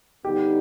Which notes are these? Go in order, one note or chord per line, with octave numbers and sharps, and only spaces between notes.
D3 G3 B3 D#4 G4